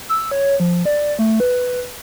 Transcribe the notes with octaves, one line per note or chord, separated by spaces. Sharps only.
E6
C#5
F3
D5
A3
B4